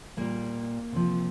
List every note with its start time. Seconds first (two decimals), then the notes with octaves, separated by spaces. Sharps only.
0.17 A#2 G3 A#3
0.92 C3 F3